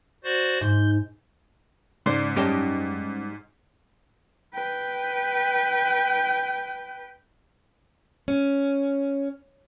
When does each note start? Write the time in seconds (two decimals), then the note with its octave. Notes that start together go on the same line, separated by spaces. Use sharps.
0.24 F#4 C5 D5
0.61 G#2 G6
2.06 G#2 C#3 G#3 C5 D5
2.36 F#2 G3 G#3 C#4 G4 D#5 A5
4.54 B4 G5
8.28 C#4